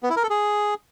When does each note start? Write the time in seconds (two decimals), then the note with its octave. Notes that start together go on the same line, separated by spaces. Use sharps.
0.03 B3
0.10 E4
0.16 A#4
0.23 A4
0.30 G#4